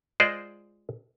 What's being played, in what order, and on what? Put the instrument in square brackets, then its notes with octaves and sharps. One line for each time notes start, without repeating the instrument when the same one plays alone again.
[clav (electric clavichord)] G#3 F4 C5 D5 D#5